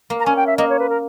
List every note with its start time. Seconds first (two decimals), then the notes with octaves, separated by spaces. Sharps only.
0.10 A#3
0.20 A#5
0.26 C#4 G#5
0.37 G5
0.47 E5
0.58 A#3 D#5
0.70 C#5
0.79 B4
0.90 A#4